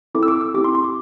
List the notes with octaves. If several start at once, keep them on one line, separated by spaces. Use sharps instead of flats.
C4 E4 A4 D6
E6
D6
E6
C4 E4 G4 D6
C6
C6
D6